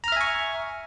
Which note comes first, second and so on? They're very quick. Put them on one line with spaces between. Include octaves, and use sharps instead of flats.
A#5 F6 E5 G#5 C#6